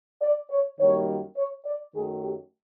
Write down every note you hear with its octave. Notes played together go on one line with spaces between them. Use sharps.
D5
C#5
F#2 D#3 G3 A#3 C#5
C#5
D5
F#2 D#3 F#3 A3 G#4
G4